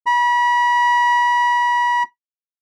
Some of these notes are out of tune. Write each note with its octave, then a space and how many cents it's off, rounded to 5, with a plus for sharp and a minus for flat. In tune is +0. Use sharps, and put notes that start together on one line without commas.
B5 -35